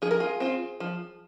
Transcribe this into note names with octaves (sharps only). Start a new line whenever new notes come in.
F3 G#4
A#4
F4 G#4
C4 F4
F3